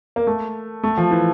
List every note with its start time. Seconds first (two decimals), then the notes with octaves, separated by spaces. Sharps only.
0.16 A#3
0.27 A3
0.84 A3
0.98 F3
1.11 E3